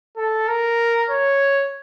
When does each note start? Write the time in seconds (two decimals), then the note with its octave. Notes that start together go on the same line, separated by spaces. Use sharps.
0.17 A4
0.47 A#4
1.10 C#5